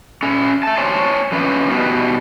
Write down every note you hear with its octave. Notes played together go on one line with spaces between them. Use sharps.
C#4 A4
E5 A5
C5 C#5 G#5 A5
F2 D3 C#4 B4
B2 D#3 G3 B3